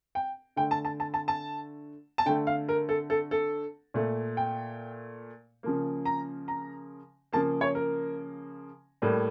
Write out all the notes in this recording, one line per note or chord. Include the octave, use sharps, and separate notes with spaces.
G5
D3 A3 G5
A5
A5
A5
A5
A5
A5
D3 A3 G5
F5
A#4
A4
A4
A4
A#2 A3
G5
C#3 F3 A#3
A#5
A#5
C#3 F3 A#3 A5
C#5
A#4
A2 G3 A#3